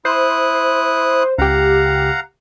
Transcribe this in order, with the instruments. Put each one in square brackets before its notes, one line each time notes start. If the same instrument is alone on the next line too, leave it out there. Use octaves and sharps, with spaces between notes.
[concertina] E4 D#6 F#6 [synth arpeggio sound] C5
[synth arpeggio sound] C#2 G4 [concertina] F5 F#5 A#5